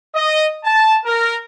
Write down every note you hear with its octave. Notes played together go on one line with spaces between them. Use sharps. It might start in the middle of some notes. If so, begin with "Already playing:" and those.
D#5
A5
A#4